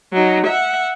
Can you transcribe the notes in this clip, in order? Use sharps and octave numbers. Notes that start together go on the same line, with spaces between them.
F#3 D#4
E5 F#5